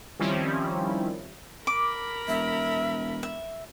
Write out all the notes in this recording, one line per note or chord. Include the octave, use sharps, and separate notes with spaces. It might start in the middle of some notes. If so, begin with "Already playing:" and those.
D#3 F3 G3 C4 C#4 E4
A#4 B5 D6
E1 E5
E5